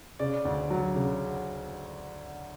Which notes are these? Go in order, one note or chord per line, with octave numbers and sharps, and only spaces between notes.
C#3 D5
D2
F#3
C#3